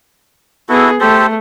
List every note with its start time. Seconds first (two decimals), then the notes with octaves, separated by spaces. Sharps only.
0.69 B3 E4 F#4 G#4 A4
1.01 A3 G4 A4 C5